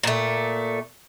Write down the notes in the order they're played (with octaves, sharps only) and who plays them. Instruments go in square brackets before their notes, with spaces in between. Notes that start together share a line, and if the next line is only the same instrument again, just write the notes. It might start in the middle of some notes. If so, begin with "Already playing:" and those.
[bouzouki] A#2 A3